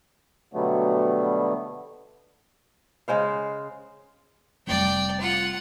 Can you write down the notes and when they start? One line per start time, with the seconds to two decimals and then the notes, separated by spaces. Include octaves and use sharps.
0.53 B2 D3 F#3 G3 A3 B3
3.08 C#3 G#3 C5 F5
4.67 F1 G3 D5 G5
5.21 F4 F#5